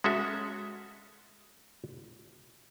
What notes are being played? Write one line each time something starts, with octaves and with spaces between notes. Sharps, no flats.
G#3 C#4 F#4 A4 E5